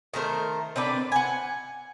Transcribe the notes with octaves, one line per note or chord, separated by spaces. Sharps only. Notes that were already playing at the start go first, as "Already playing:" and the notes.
D#3 A3 A#4 C5
C4 D4 B4 D5
F#5 G#5